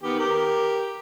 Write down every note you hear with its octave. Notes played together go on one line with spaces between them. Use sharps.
D#3 B3 G4
G4 A#4